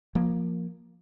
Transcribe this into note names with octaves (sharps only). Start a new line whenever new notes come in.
F3 A#3